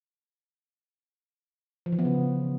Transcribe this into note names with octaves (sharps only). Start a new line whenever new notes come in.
F3
E3
B3
C#3